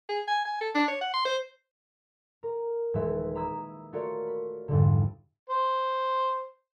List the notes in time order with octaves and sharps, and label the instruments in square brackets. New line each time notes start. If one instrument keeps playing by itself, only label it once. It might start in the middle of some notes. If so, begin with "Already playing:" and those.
[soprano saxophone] G#4
G#5
G#5
A4
D4
C#5
F#5
C6
C5
[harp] A#4
D#1 E3 G#3 B4 E5 G#6
A#5 B5 D#6 E6 G#6 E7
A3 F4 F#4 A#4 C#5 D5
B5
C2 F2 G#2 D3
[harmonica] C5